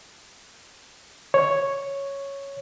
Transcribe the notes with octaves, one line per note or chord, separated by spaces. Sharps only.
C#5